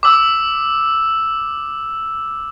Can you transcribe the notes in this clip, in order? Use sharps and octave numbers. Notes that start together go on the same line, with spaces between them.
D6 E6